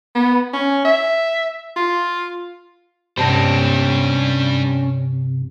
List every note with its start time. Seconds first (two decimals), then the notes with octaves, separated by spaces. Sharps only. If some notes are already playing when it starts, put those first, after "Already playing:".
0.15 B3
0.53 C#4
0.85 E5
1.76 F4
3.18 G2 C3 G3 C#4 D4 C5 A5 A#6